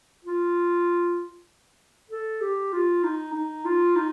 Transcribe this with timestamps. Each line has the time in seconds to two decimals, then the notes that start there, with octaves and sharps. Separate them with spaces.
0.24 F4
2.10 A4
2.41 G4
2.73 F4
3.04 D#4
3.34 D#4
3.65 F4
3.96 D#4